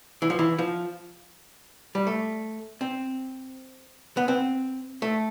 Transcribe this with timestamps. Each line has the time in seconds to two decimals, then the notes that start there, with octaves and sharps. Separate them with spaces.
0.22 E3
0.30 F3
0.39 E3
0.58 F3
1.95 G3
2.07 A3
2.81 C4
4.17 B3
4.28 C4
5.02 A3